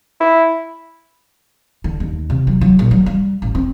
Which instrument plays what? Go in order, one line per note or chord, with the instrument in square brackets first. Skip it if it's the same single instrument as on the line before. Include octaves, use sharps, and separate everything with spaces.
[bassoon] E4
[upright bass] D3
D#2
C3
F#3
F#3
A#1
F#3
G3
A1
C4